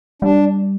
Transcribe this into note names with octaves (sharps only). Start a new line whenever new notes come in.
G3 D4